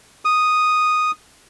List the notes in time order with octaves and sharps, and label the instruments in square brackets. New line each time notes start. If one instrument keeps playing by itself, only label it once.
[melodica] D#6